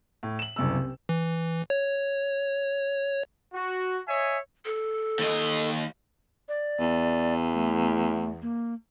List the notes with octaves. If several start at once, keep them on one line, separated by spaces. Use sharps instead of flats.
A2
E7 F#7
F#1 C2 E6
C3
E3
C#5
F#4
C#5 D#5 E5 G#5
A4
D#2 D#5
D5
E2
A3
A#3